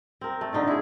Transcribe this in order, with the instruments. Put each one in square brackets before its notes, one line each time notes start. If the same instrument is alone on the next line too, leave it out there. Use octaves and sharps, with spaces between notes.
[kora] C4 A#4
A3
D3 D#4 F4 D5
E4 G#4